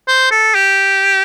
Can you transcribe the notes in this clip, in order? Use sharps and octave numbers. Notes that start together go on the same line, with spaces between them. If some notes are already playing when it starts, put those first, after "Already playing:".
C5
A4
G4